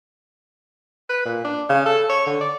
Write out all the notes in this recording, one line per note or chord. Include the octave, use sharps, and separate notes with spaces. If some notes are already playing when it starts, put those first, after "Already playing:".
B4
A#2
D4
C#3
A4
C#5
D3
D5